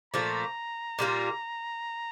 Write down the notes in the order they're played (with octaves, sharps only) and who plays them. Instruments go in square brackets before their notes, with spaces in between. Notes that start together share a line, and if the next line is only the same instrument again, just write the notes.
[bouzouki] A#2 F3 A3 [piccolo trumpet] A#5
[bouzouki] A#2 G3 A#3 F4